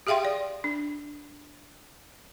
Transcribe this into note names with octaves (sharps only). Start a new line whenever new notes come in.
G4 G#4 E5 F5 G5 C6
D5
D4